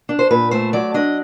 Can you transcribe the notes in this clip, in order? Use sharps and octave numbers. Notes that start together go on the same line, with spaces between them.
D4
C5
A#2 B4
A3 C5
F#3 D5
D4 D#5